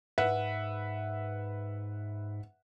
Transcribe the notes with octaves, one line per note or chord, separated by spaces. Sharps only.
G#2 B4 E5 F#5